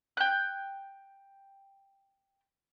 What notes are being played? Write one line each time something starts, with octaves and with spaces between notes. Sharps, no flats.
G5 F#6